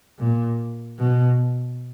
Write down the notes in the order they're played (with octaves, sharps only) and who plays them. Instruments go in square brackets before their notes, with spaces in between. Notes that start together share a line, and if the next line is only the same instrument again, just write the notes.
[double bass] A#2
B2